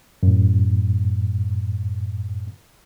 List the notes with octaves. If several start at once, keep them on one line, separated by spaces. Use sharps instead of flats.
F#2 A2